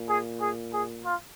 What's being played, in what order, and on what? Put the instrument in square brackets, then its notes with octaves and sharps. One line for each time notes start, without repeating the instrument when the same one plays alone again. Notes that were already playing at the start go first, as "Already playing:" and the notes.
Already playing: [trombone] A#2
[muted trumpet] G#4
G#4
G#4
F4